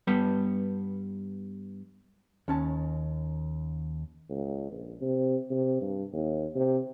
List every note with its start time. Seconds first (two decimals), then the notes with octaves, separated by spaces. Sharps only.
0.07 G2 G3 B3
2.48 D#2 C#4 A5
4.30 C#2
4.71 A#1
5.01 C3
5.51 C3
5.81 G2
6.13 D#2
6.56 C3